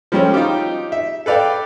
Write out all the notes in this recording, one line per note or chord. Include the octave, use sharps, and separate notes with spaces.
F3 G3 C#4 A4
D#4 F4 G4
E5
A4 B4 D5 F5 G5